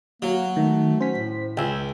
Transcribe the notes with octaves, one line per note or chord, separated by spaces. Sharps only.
F#3 A#3
D#3 A3
C#4 C5 B6
A2
C#2 G5 G#5 E6